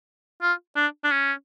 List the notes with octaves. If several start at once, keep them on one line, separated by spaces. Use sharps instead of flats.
F4
D4
D4
C#4